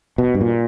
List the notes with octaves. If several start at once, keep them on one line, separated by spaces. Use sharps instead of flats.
B2
G2
A#2